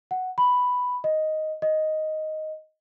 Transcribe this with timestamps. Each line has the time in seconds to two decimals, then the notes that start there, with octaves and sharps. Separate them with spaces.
0.11 F#5
0.38 B5
1.04 D#5
1.62 D#5